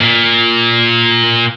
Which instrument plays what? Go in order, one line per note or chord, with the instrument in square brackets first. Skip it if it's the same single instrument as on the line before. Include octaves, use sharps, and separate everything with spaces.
[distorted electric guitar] A#2